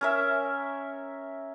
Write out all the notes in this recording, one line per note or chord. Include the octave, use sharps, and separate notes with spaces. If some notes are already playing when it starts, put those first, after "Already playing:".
C#4 A#4 E5